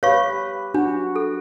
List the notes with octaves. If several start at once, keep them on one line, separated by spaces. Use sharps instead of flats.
G4 B4 C#5 F5 C#6
D4 F#4
A4